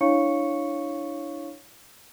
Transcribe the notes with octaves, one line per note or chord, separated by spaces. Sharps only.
D4 E4 C#5 F5 C#6 C#7